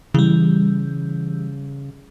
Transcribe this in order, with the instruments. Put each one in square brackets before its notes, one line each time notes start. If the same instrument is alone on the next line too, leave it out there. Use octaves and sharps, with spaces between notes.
[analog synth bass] C#3 [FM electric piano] E3 G3